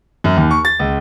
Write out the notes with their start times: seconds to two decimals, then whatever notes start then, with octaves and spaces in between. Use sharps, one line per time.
0.24 F#2
0.36 D#2
0.51 C#6
0.65 A6
0.79 C#2